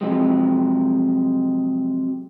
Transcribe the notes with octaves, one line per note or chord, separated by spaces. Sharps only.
C3 F3 F#3 G#3